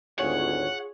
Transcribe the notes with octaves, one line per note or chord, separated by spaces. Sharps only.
G#1 D2 F4 G#4 C#5 F#5